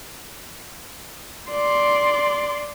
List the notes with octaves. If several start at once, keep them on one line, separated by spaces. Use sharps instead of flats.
D5 C6